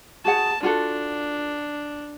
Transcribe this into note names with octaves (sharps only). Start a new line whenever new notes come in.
F#4 G#4 F#5 A5
D4 F4 F#4 A4